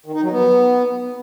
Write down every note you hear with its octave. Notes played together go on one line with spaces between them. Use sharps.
D#3
D#4
F#3
B3